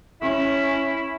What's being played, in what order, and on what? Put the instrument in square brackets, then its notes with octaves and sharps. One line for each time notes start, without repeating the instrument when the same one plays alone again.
[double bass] C#4 [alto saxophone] E4